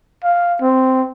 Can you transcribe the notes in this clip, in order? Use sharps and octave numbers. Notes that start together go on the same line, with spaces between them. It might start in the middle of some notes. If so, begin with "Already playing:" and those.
F5
C4